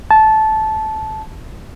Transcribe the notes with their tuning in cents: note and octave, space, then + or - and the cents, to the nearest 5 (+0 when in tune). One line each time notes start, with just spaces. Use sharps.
A5 -15